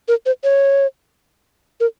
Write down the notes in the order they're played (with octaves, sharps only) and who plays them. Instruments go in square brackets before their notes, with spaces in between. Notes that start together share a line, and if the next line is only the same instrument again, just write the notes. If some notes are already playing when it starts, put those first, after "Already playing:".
[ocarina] A#4
C5
C#5
A#4